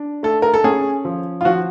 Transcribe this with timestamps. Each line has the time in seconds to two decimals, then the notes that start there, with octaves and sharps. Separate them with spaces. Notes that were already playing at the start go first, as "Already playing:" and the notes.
Already playing: D4
0.23 A3 A4
0.42 A#4
0.54 A4
0.64 C#4 G#4
1.05 F3
1.41 F4
1.45 F3 F#4